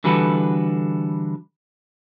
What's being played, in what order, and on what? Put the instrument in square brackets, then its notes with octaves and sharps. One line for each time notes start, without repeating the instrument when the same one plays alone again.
[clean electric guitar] D3 E3 G3 F#4 A4 B4